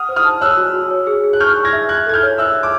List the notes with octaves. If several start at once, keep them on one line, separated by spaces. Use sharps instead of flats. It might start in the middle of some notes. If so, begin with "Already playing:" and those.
Already playing: F#5 D#6 F6
C5
D#6 F6
A5
C#5 E6 F#6
F#4
F#4
C#5
G#4
G#4
F#6
C#6 F6 G6
C#6
G#6 A#6
E5
E5 F#6 G#6
A4 G#6
F6 G6
C#5
E5 E6 F#6
E5
D6